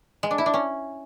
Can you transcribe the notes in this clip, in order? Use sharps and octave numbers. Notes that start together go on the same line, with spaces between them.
G#3
D4
E4
D4
C#4